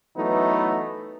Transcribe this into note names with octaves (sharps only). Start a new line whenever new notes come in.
E3 F#3 A3 B3 D#4